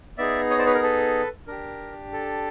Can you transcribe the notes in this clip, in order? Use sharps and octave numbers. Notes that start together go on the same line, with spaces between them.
B3 D#4 G#4 D5 E5
C#5 D#5
C5 D5
B4 C#5
A#4
A4 B4
D4 G4 A#4
A4